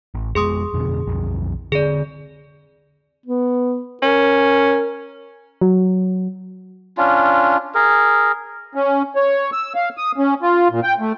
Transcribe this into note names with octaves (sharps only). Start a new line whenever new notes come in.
A1
F2 G#3 B3 G#4 C6 D#6
F2 B2 D3
B1 F2
D3 C4 G#4 D5
B3
C#4 A#4
F#3
C#4 D4 F4
G#4 A#4
C#4
C#5
E6
F5
D#6
C#4
F4
A#2
G5
A3